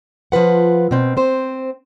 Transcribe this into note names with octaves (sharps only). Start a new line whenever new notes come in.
F3 F4 B4 F#5
B2 C4
C4 C5